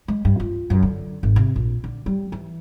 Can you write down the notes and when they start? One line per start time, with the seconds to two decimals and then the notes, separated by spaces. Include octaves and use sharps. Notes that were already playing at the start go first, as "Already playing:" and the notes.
0.08 G#3
0.25 G2
0.40 F4
0.70 F#2
0.83 D3
1.23 G#1
1.36 C3
1.56 A#1
1.84 D3
2.06 G3
2.32 E3